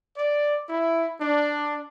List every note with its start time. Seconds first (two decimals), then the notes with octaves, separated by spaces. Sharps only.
0.17 D5
0.69 E4
1.20 D4